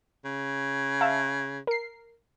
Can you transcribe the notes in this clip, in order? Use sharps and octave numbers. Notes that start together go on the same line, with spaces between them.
C#3
E5 F5 A5
A#4 C7